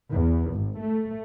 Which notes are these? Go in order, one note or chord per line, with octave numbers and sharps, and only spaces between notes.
E2
G#1
A3